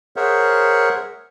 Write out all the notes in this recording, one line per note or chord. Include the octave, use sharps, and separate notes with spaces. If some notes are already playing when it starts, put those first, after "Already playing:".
G#4 A#4 C5 C#5 E5 F#5